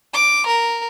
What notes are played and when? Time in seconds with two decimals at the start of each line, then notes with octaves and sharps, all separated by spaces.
0.14 D6
0.47 A#4